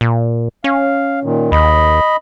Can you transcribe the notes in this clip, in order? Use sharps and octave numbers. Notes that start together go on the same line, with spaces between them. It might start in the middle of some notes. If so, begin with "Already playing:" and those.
A#2
C#4 F5
A#2 D#3
D#2 D#5 B5